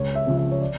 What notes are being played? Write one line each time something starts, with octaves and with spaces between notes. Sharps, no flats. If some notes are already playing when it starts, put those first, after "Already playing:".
Already playing: C#2 C#5
E5
C#3 F3
E5
C#5
D5